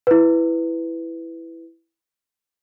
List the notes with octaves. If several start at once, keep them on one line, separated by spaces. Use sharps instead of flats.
E4 B4